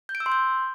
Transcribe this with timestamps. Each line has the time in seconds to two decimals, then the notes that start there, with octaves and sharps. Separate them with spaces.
0.09 G6
0.15 D7
0.20 E6
0.26 C6
0.32 G6